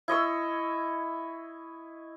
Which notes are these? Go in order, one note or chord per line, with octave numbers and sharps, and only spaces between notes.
E4 D#5 C#6 E6